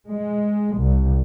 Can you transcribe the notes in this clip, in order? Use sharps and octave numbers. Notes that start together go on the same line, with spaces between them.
G#3
C2